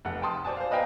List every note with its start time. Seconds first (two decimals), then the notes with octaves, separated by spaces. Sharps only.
0.05 F1 F#5
0.22 G5 A5 C6 D#6
0.44 C5 D5 G#5 A5
0.57 C5 F5
0.71 B4 D#5 F5 G5 G#5 A#5